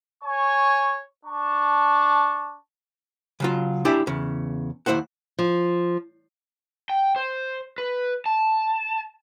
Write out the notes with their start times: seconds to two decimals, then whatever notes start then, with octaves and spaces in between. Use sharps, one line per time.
0.23 C#5 G#5 C#6
1.25 D4 A5 C#6
3.40 C#3 F#3 F4
3.85 D4 E4 G4 D5 E5 G#5
4.07 E2 C#3
4.86 D#2 C#3 E4 C5 F#5
5.39 F3
6.90 G5
7.16 C5
7.78 B4
8.26 A5